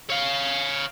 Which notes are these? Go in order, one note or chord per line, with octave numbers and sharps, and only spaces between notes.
C#5 F5